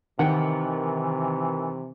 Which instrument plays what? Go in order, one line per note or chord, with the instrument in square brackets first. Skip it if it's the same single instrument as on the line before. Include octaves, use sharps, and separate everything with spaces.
[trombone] C3 [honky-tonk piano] D#3 [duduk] E3 [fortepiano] F#5 G5